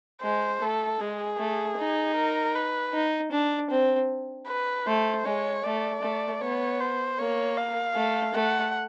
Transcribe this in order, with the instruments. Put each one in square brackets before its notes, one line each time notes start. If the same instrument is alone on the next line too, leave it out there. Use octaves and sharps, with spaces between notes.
[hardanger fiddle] G#3 [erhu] C5
[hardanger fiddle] A3 [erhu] A4
[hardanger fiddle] G#3 [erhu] G#4
[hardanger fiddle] A3
D#4
[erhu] A#4
B4
[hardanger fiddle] D#4
D4
C4
[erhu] B4
[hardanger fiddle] A3 [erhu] C5
[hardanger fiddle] G#3 [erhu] C#5
[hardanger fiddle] A3 [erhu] D5
[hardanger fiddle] A3
[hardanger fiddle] B3 [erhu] C#5
[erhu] C5
[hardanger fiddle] A#3 [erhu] C#5
[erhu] F5
[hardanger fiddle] A3
[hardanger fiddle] A3 [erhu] F#5